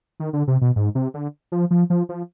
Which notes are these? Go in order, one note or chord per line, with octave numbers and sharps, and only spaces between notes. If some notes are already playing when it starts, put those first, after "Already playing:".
D#3
D3
C3
B2
G#2
C3
D3
F3
F3
F3
F3